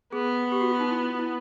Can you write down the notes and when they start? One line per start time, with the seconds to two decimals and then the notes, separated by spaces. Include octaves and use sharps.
0.13 B3 G#4
0.52 G4
0.61 F#4
0.71 F4
0.80 D#4
0.89 E4
1.19 E4